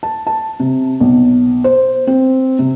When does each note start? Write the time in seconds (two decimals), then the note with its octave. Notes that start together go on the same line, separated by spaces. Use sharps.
0.03 A5
0.27 A5
0.60 C3
1.00 B1
1.64 C5
2.07 C4
2.59 C3